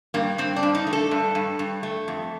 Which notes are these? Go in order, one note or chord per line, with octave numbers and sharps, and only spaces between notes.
G2 A#3
G2 C4
D4
G2
D#4
A3
A4
G2
G2
G2
A3
F2